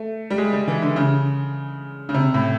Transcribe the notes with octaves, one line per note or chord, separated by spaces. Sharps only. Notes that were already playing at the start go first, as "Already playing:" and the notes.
Already playing: A3
G3
G#3
G3
E3
D3
C#3
C#3
C3
A2